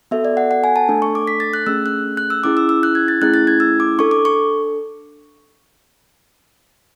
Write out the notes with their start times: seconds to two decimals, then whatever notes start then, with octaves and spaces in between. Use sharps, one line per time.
0.11 B3 F#4 A4 E5
0.25 D5
0.37 F#5
0.51 F#5
0.64 G#5
0.76 A5
0.89 A3 D4 A4
1.02 C#6
1.15 D6
1.27 B6
1.40 A6
1.53 F#6
1.66 A3 C#4 G#4 E6
1.86 F#6
2.17 F#6
2.30 E6
2.44 C#4 E4 G#4 D6
2.57 E6
2.69 E6
2.83 F#6
2.95 G#6
3.08 A6
3.21 A3 C#4 E4 G#4 F#6
3.34 A6
3.47 G#6
3.60 E6
3.80 D6
3.99 D4 A4 C#6
4.11 D6
4.25 C#6